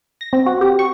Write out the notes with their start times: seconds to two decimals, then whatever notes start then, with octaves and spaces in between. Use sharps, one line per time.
0.21 A#6
0.33 C4
0.46 F#4
0.61 G4
0.79 C#6